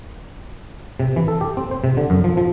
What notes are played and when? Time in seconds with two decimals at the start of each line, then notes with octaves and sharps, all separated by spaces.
1.00 C3
1.16 E3
1.28 A4
1.41 G4
1.57 C4
1.71 C5
1.84 C3
1.97 D3
2.10 F#2
2.24 F3
2.37 F3